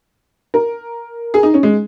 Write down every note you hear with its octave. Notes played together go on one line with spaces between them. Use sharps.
A#4
G#4
D#4
C#4
G#3